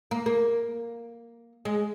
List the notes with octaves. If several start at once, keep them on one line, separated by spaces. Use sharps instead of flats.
A#3
A#3
G#3